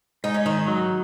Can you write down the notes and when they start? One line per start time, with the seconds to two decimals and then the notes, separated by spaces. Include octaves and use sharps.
0.24 G#2 D#4
0.34 C#4
0.46 D#3 D#4
0.67 F#3